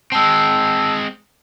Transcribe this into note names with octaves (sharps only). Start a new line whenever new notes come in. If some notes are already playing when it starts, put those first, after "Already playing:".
G#3 C4 A5 E6